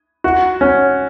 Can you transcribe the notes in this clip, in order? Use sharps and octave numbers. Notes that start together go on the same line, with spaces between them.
F#4
C#4